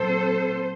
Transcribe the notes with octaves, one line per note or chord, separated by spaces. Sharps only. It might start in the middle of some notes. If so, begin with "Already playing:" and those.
Already playing: A#2 F#3 C4 A4 C5